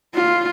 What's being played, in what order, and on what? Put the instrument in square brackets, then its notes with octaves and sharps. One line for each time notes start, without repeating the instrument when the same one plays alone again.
[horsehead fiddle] F4